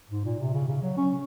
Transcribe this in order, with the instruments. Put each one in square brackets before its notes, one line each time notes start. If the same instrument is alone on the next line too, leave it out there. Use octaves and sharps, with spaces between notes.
[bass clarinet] G#2
A#2
C3
C#3
C#3
F#3
C#4